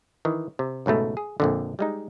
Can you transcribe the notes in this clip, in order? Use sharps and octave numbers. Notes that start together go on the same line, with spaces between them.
D#3 E3
C3
C#2 G#2 B2 A3
G#4
A#1 F2 D3
G3 G#3 D#4